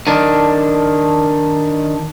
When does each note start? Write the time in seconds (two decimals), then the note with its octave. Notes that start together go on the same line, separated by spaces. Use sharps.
0.07 D#3 D4